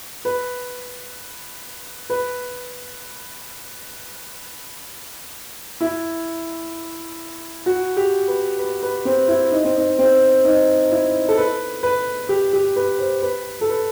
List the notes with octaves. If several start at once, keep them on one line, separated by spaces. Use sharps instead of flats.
B4
B4
E4
F#4
G4
B4
B4
B4
C4
E4
D#4
C4
D#4
C4
D#4
E4
A4
B4
B4
G4
G4
B4
C5
B4
A4
B4